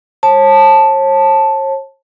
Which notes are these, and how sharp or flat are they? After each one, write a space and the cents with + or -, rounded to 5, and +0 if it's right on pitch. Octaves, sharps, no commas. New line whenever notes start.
C#5 -45 A5 +0